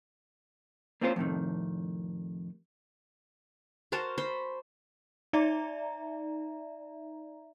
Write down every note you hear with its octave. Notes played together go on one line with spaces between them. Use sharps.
A#3 C4 C#4 F4 A4 C5
F2 A2 C3 D#3
F#4 A#4 C5 A5
C5 B5
D#4 D5 E5 A#5